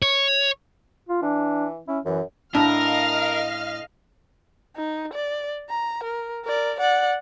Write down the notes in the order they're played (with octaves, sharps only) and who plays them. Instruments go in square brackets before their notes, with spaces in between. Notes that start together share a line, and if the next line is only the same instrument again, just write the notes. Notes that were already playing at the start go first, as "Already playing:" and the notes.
[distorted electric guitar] C#5
[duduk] F4
[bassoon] E3 [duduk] D4
[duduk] C#4 [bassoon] E4
[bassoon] F#2 [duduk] E3
[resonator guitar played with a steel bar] A2 [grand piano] D4 [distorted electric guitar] A#4 [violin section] D#5 F5 F6
[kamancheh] D#4
D5
A#5
A#4
A#4 D5
D5 F#5